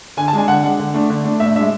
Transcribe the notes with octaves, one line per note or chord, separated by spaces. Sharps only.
D3 G#5
A5
G#3 D4 G#5
D3 F#5
G#3 D4 F#5
D3
A3 D4
D3
A3 D4
A2 E5
G#3 D4 E5